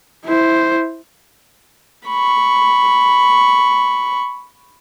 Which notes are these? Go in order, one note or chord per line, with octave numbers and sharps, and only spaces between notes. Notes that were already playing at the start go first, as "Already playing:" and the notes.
E4 C5
B5 C#6